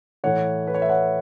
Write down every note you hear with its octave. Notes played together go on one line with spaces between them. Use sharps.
A2 E3 A3 C#5 F#5
B4
C#5
E5
C#5 F#5